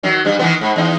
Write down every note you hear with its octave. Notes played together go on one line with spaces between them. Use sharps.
D#3 F#3
G2 G3
D#3 E3 B3
G#2
E2 D#4